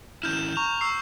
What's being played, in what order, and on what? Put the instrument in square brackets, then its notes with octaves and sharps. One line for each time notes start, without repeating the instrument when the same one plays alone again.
[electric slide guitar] D#3 C#4 E4 [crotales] F6 G6 E7
[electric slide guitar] A#5 [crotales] C#6
[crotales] C#6 E6 C7